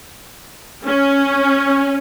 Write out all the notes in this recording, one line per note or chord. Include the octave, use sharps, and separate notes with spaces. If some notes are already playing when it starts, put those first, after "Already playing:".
C#4